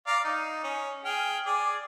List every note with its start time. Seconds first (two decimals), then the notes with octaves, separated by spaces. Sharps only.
0.07 D5 F5 A#5
0.24 D#4
0.64 C#4
1.05 G#4 G5 F6
1.46 G#4 D5